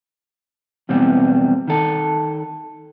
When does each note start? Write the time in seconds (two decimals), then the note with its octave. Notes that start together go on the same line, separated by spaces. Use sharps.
0.89 E2 B2 G3 C4
1.68 D#3 A4